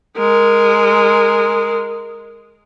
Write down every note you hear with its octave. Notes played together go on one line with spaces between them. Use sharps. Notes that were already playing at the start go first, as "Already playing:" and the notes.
G#3 A#4